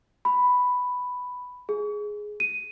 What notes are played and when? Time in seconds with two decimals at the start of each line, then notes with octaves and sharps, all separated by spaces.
0.25 B5
1.69 G#4
2.40 D#7